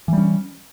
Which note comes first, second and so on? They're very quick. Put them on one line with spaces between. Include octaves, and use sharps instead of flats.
E3 G3 C#4